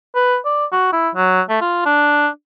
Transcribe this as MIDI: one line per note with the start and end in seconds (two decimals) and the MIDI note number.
0.15 0.37 71
0.45 0.65 74
0.72 0.89 66
0.93 1.09 64
1.15 1.42 54
1.49 1.58 57
1.61 1.84 65
1.85 2.28 62